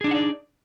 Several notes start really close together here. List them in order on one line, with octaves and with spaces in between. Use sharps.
G#4 D4 D#4 F#5 D5